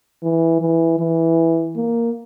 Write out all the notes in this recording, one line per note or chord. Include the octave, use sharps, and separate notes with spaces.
E3
E3
E3
A#3